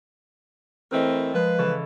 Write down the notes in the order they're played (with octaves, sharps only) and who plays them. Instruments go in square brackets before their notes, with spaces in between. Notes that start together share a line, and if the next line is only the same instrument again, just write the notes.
[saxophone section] E3 A3 C4 [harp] A#4 B4 D#5
[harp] F3 G#3 [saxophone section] B4
[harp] C#3 E3 A4